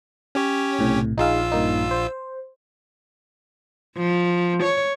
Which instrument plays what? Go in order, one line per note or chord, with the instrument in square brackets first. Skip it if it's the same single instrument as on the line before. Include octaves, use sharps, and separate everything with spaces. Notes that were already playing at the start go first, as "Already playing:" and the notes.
[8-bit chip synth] C#4 G4 C#5
[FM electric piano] B1 A2 C3
[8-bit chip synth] A#1 F4 E6 [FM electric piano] D#4 G#4 F5
[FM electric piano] G2 A#3 D#4
C5
[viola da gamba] F3
C#5